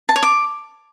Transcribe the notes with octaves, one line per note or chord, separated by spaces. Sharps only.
A5
C#5
D6